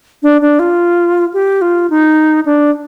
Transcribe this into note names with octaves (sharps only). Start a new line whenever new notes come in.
D4
D4
F4
G4
F4
D#4
D4